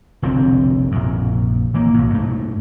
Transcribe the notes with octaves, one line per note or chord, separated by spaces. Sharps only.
F1 B1 D3 C4
A#1 F#2
E3 A#3
B1 A2
G2 A3